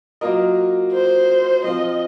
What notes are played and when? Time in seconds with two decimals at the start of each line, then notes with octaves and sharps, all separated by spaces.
0.21 F#3 A#3 F4 A#4 D#5
0.93 C5
1.64 F3 C4 F4 D#5